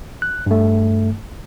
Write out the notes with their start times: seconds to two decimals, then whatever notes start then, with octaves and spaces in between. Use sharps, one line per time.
0.22 F#6
0.46 G2 A3